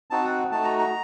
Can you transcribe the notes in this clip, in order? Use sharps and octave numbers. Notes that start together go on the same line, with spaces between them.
C4 D#4 F#4 A5
F#5
A3 D#4 F#4 A5
A#5
A#5